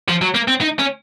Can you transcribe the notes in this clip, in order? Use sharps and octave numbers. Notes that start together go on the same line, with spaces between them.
F3
F#3
A#3
C4
D#4
C#4